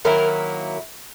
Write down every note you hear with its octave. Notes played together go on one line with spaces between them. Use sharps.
D#3 F#3 A#3 E4 A#4